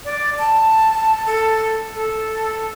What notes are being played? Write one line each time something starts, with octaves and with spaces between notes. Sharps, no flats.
D5
A5
A4
A4